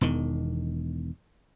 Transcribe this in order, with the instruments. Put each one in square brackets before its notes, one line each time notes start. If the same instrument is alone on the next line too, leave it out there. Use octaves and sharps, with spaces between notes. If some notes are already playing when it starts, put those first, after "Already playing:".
[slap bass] E1 E2 D#3